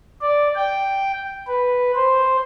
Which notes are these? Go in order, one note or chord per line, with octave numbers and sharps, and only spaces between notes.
D5
G5
B4
C5